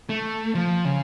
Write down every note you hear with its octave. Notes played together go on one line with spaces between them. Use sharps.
A3
F3
C#3